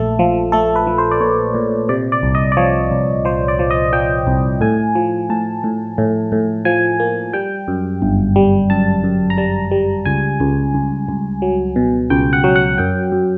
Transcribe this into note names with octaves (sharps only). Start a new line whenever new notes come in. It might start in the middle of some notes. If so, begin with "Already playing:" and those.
Already playing: A#1 A#2 A3 A4
F3
A3 A4
B4
F3
C5
D5
A#2 C#5
A#2
C3 D5
D5
C2
D#5
D5
F3 C#5
C2
F3 C5
D5
F3
D#5
F3 G5
C2
A2 G#5
F3
A2 A5
A2
A2
A2
F3 G#5
A#3
G3 G5
F#2
G1
G3
F#2 A5
F#2
A#5
G3 A5
G3
C#2 G#5
C#2
C#2
C#2
F#3
B2
C#2 G5
F#5
F#3
F#5
F#2 G5
F#2